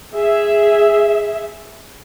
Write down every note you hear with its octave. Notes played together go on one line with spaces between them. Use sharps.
G#4 E5